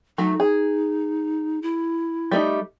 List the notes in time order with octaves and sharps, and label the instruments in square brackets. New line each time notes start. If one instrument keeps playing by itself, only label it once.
[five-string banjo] F#3 A3 [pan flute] D#4
[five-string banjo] G#4
[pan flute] E4
[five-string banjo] G3 A3 D#4